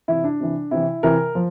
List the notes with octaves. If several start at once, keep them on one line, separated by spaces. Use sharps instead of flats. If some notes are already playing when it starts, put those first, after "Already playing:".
C3 E3 E4
D4
C3 E3
C3 E3 E4
C3 E3 A#4
F3